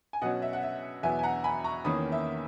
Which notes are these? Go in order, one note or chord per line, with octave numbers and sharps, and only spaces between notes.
G#5
B2 F#3 C#4 D#5 F#5
E5
F#5
E5
E2 B2 F#3 B3 E5 G#5
G#5
F#5 A#5
G#5 B5
A#5 C#6
E2 D#3 A#3 C#4 B5 D#6
E5